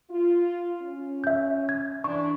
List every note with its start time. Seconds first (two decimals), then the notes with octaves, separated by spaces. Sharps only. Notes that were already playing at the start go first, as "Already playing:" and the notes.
0.11 F4
0.83 C#4
1.24 E5 G6
1.69 G#6
2.04 E3 D4 C#6